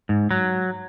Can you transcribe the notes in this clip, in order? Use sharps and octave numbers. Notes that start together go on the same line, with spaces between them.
G#2
F#3